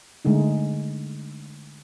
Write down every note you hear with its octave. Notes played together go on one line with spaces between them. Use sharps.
D3 G#3 A3 D#4